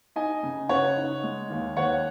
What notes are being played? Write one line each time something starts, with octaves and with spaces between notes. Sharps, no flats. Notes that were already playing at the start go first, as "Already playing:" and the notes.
D#4 D#5 G#5
C#3
C#3 C#5 F#5
D#4
G#3
D#2
D#2 C#5 F#5